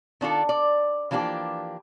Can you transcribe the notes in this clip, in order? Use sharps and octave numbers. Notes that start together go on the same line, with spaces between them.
D#3 D4 F4 A4
D5
E3 F3 A#3 D4 G4